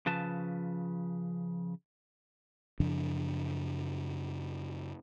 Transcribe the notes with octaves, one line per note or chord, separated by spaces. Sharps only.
C#3 F3 B4 A5
F#2 C#3 F3 D4